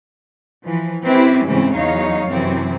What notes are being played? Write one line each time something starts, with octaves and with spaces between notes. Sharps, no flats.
E3 F3
C4 C#4 E4 G4 B4 C5
G#2 C#3 E3 A3 C4 C#4
E2 F#3 D#4 C#5 F5
F#2 C3 E3 C4